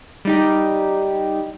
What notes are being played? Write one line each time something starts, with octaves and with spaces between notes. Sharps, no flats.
G3 D#4 G4